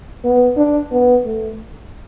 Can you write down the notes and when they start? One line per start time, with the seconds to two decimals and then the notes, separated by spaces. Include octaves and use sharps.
0.25 B3
0.57 D4
0.92 B3
1.25 A3